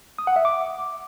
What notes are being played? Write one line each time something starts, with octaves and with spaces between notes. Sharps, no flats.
D#6
F#5
E5
D6